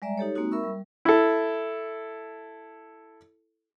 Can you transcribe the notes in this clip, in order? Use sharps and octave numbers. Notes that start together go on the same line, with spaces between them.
G3 G#3 D5 E5 A#5
D#4 G4 A4 C#5
G#3 A#3 C4 D#4 F#4
A#4 E5 B5 C#6 E6
G3
E4 A4